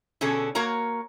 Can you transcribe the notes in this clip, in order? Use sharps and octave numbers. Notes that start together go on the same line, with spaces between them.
B2 D3 C#4 G#4 A4
A#3 F#4 A#4 C#5 A#5